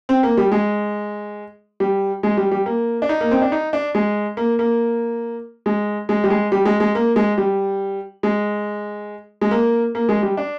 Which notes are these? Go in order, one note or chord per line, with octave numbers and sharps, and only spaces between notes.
C4
A#3
G3
G#3
G3
G#3
G3
G3
A#3
D4
D#4
A#3
C4
D4
D#4
D4
G#3
A#3
A#3
G#3
G#3
G3
G#3
G3
G#3
G#3
A#3
G#3
G3
G#3
G#3
A#3
A#3
G#3
G3
D4